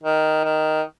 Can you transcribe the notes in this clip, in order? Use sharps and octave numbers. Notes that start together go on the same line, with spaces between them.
D#3
D#3